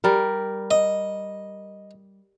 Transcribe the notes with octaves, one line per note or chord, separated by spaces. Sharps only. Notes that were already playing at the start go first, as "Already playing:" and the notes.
G3 A#4
D#5